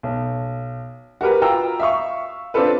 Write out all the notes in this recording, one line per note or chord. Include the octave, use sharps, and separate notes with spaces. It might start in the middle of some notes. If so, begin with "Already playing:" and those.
B1
F#4 G4 A#4 B4
F4 G5 A#5 E6
E5 F5 C#6
C4 D4 F4 A4 B4